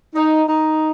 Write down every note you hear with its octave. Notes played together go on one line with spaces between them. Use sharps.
D#4
D#4